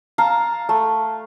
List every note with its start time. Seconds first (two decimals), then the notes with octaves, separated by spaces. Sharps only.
0.18 F5 A5 A#5
0.69 A3